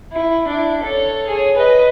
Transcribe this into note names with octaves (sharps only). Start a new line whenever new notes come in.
E4
D4 E4
A4 C#5
G#4 C#5
B4 D#5